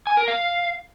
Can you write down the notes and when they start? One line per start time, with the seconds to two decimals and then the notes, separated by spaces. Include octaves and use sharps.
0.07 G#5
0.17 A#4
0.28 F5